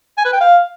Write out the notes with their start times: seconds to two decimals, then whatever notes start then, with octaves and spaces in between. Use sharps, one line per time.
0.18 G#5
0.25 B4
0.33 G5
0.41 F5